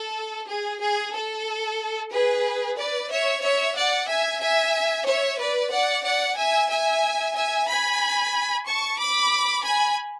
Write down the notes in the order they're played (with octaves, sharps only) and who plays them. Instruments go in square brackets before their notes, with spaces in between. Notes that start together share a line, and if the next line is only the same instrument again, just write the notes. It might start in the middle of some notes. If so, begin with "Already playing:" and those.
Already playing: [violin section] A4
G#4
G#4
A4
G#4 B4
B4 D5
C#5 E5
C#5 E5
D5 F#5
E5 G#5
E5 G#5
C#5 E5
B4 D5
D5 F#5
D5 F#5
E5 G#5
E5 G#5
E5 G#5
G#5 B5
A5 C#6
B5 D6
G#5 B5